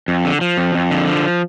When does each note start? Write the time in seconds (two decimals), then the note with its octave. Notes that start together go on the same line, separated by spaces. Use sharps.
0.08 F2
0.25 D3
0.41 F3
0.58 F2
0.74 F2
0.91 D3
1.07 F3